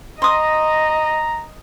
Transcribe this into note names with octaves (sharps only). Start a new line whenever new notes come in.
D#5 A#5 C6 D#6